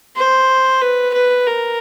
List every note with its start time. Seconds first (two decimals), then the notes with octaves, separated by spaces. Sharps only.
0.16 C5
0.82 B4
1.14 B4
1.47 A#4